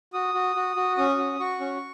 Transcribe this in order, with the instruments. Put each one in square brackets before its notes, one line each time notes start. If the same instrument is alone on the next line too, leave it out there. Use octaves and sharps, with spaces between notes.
[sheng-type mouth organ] F#4 D#6
F#4
F#4
F#4
C#4 D#6
F#4
F#4 C#6
C#4